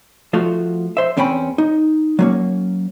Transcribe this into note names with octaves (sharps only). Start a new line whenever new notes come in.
F3 A3 F4 F#4
C5 E5
E2 C4 C#4 G5 B5
D#4
F#3 A#3 C#4